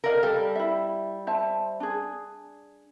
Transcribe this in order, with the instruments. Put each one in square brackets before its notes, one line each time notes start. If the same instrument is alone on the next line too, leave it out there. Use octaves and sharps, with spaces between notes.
[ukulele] A4 D5 D#5 [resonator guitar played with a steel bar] A#4 F5
[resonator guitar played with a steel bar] G3 [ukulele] A4
[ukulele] E4 E5
C5 E5 A5
D4 G#4